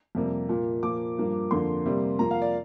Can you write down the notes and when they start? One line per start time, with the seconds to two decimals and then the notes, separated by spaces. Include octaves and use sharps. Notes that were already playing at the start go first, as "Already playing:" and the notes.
0.15 F2 C3 G3 A#3
0.49 A#2 A#3
0.83 A#2 F3 A#3 D6
1.18 G2 F3 A#3
1.51 F2 D3 F3 A#3 C6
1.85 C3 G3 A#3
2.19 F2 F3 A#3 A#5
2.31 F5
2.42 D5